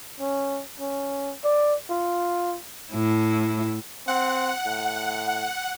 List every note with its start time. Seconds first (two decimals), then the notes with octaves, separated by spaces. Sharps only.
0.20 C#4
0.80 C#4
1.44 D5
1.90 F4
2.92 A2 E4
4.08 C4 F#5
4.66 A2